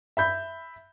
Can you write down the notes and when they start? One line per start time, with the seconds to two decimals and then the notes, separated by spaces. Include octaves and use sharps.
0.17 E5 B5 G6